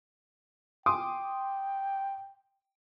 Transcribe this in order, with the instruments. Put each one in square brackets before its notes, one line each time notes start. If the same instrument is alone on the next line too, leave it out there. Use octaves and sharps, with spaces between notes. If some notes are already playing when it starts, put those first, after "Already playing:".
[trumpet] G5 [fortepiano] C6 D6 D#6